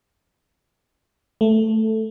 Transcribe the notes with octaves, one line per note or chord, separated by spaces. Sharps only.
A3